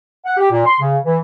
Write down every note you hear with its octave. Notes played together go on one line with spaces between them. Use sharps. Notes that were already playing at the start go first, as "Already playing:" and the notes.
F#5
G4
A#2
C6
C#3
E3